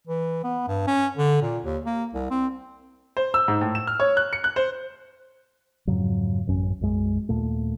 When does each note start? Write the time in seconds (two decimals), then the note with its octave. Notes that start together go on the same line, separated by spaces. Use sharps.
0.07 E3
0.44 B3
0.67 G2
0.87 C#4
1.17 D3
1.42 A#2
1.64 D#2
1.86 A#3
2.13 C2
2.31 C4
3.17 C5
3.34 E6
3.48 G#2
3.61 A2
3.75 E7
3.87 F6
4.00 C#5
4.17 F#6
4.33 C#7
4.44 F#6
4.56 C5
5.87 F2 G#2 C#3 F#3
6.47 A1 F#2 C#4
6.81 B1 F#2 G#3
7.29 D#2 A#2 A3